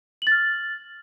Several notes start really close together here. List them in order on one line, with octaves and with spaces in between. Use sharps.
F#7 A6 F6